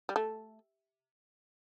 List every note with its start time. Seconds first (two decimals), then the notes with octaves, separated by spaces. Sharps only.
0.09 G3
0.16 A3